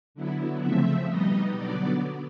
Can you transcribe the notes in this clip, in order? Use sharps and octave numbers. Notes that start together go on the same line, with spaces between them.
D3 F#3 B3 E4
C#3 F3 A3 C4 E5
B2 G3 B3 D#4 D#5
D3 F#3 B3 D5